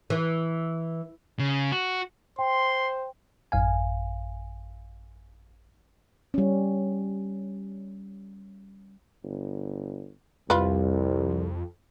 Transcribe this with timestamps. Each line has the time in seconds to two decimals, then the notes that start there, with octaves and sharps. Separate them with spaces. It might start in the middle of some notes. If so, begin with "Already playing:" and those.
0.10 E3
1.39 C#3
1.72 F#4
2.39 C5 G5 C6
3.52 A1 F#2 F5 G#5
6.34 G3 C#4
9.23 G1
10.50 C2 F2 G3 F4 B4